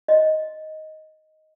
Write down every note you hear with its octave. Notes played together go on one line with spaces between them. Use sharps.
D#5